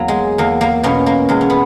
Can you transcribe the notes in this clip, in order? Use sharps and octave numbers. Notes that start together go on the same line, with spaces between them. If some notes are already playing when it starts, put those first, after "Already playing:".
Already playing: E2 F#3 A#3
G#3
E2 A#3
A#3
B2 A#3 C#4
A#3
E2 G#3
C#4
B3